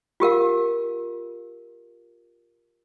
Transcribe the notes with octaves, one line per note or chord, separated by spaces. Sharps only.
F4 G4 A#4 F5